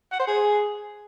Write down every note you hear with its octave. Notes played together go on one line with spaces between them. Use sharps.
F#5
C5
G#4